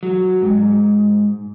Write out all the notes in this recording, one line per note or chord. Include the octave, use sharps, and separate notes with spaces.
F#3
G#2